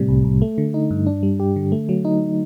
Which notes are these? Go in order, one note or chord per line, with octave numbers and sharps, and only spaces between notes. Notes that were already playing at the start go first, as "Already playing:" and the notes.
Already playing: A2 C3 G3
C2
C2
A3
D3
D#4
G2
D4
G3
G4
D3
A3
F#3
D#4